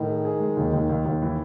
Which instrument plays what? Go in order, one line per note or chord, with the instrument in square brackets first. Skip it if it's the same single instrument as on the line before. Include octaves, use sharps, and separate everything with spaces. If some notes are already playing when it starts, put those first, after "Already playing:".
Already playing: [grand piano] A2 [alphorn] D#3
[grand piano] G#4
G#4
G#3
D#2
D#2
D#2
D#2
E3